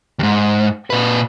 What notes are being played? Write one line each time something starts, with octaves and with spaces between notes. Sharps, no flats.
D#2 G#2
A#2 B4